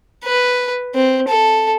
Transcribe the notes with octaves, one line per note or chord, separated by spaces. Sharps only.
B4
C4
A4